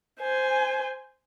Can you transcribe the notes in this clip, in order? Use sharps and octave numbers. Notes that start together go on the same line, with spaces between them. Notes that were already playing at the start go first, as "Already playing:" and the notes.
C5 G#5